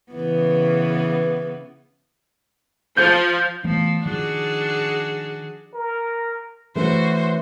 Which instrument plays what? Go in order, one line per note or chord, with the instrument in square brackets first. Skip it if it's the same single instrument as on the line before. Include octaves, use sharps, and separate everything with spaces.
[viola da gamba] C#3 E3 B3
[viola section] F3 [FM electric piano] G6
[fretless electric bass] E3 A3 B3 [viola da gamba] F3
[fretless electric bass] D#3 F3 [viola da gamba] D4 F#4 G#4
[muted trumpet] A#4
[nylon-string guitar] E3 A3 C#4 [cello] F#4 C5